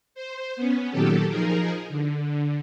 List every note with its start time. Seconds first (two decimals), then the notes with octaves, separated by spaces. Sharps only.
0.15 C5
0.56 B3 C#4
0.90 A#2 D#3 F#3 G4 A4
1.29 F3 D#4 G#4 A#4
1.89 D3